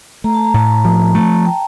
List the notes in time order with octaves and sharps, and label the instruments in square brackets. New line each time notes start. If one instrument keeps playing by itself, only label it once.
[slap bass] A3 [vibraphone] A#5
[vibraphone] A5
A#5
[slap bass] A2 [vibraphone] A5
[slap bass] F3
[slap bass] A3 [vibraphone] A5
[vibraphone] G5